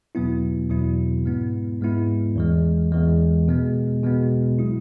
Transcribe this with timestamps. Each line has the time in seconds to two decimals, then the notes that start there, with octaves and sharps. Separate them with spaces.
0.15 E2 B2 F#3 B3 E4
0.70 E2 B2 F#3 B3 E4
1.25 G#2 G#3 B3 E4
1.81 G#2 G#3 B3 E4
2.36 E2 E3 G#3
2.92 E2 E3 G#3
3.48 B2 G#3 B3
4.03 B2 G#3 B3
4.59 F#3 E4